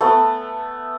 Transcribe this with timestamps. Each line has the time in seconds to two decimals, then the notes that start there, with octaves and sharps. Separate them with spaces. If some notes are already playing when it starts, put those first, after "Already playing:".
0.01 A3 B3